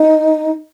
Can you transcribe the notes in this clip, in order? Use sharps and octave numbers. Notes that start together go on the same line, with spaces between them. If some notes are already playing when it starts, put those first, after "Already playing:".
Already playing: D#4